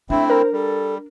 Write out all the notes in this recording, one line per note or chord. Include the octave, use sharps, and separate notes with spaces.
A3 C4 D4 E4 E5
A#4 C5
G3 A4